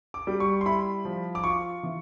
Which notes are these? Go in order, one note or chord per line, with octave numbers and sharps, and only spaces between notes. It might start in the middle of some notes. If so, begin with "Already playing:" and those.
D6
G3
C#6
C6
E4 B5
F3
D6
F4 C#6
E3